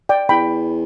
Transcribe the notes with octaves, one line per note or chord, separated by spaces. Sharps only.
D5 G5
E2 G5 B5